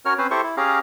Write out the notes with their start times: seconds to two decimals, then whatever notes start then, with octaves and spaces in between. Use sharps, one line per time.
0.05 C#4 F#4 A#4 C#5 F6
0.18 C4 C#4 B4 C5
0.31 E4 G4 A4 C5 C#6
0.43 E4
0.57 C#4 G4 G#4 F5 A#5